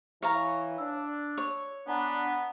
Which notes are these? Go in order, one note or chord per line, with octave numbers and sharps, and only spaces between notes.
E3 C#5 F5 A#5 C#6
D4 E6
C#5
B3 D4 F#5 G#5 A#5